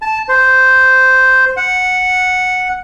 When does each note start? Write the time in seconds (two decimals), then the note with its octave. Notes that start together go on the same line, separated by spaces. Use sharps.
0.02 A5
0.28 C5
1.57 F#5